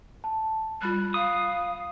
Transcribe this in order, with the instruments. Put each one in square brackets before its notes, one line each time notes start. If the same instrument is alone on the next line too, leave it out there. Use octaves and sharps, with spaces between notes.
[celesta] A5
[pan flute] G3 [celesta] F4 B5 F#6
[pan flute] F5 [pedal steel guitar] D#6